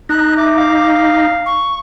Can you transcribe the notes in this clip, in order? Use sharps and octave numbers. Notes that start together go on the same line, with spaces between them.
D#4 F#6
E5 D6
F5
C#6